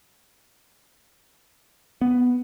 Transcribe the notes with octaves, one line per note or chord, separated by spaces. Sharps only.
B3